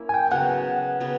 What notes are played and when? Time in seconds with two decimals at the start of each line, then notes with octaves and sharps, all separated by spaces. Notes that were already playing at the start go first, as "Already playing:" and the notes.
Already playing: A#3 C#4 E4
0.09 G#5
0.14 G5
0.31 C#3 F#3 B3 F#5
1.00 C#3 F#3 B3